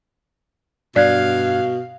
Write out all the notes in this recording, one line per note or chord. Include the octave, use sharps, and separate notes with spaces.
G2 B2 D5 F5 F#6 G#6